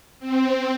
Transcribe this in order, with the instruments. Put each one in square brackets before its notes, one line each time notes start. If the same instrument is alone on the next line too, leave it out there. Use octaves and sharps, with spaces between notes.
[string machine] C4